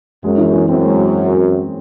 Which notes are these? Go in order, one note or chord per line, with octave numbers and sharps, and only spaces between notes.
F#2 G#3
E3
E3
F#2 C4
G#3